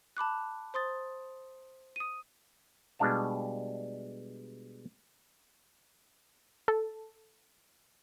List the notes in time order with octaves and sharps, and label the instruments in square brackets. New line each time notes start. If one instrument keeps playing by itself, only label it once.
[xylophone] A5 B5 D6 F#6
C5 C6 D#6 A6
D#6 D#7
[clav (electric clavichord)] B2 G3 G#3 D4 F5 A5
[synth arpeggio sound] A4